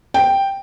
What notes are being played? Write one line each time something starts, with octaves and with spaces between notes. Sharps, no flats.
G5